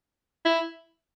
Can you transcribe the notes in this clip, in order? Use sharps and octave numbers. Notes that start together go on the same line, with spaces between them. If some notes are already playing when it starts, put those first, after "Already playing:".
E4